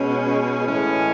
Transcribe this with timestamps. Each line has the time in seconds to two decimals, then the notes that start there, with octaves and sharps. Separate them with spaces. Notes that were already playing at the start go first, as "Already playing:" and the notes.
Already playing: B2 G#3 C#4
0.66 A2 E3 G#3 C#4